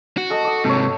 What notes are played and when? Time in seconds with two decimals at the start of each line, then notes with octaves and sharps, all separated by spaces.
0.18 F#4
0.30 A4 D#5 A5
0.44 D#5 D6
0.65 G#2 C3 A4 C#5